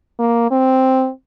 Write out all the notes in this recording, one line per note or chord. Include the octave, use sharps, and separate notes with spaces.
A#3
C4